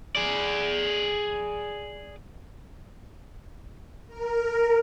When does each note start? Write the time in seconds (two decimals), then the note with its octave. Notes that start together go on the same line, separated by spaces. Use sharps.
0.16 G#4 D5
4.07 A#4